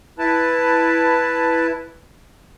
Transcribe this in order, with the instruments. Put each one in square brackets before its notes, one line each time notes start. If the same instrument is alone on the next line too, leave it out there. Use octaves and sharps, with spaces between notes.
[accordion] E4 B4 A5